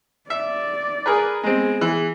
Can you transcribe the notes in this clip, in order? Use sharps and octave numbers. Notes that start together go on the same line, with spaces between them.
D5 E5
G#4 A#4 B4
G#3 B3 C4 G#4
E3